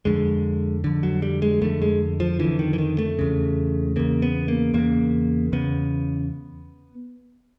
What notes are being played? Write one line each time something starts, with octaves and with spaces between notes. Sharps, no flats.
F2 D3 G#3
F2 D3
F#3
G3
G#3
F2 D3 A3
G#3
F3
F2 D3 E3
D#3
E3
D#3
A3
E2 C#3
E2 C#3 A#3
B3
A#3
E2 C#3 A#3
E2 C#3 B3